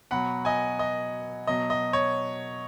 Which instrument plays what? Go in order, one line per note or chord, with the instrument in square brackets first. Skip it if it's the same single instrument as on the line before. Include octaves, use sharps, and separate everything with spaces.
[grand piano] B2 F#3 F#5 B5
D#5 G#5
D#5
B2 F#3 D#5
D#5
C#5